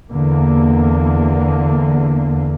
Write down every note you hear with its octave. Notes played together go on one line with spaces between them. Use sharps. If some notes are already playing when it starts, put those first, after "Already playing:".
E2 D3 A#3